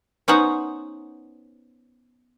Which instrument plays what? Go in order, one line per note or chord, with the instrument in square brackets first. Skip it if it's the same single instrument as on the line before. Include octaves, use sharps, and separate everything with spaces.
[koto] B3 C#4 D#4 C5 F#5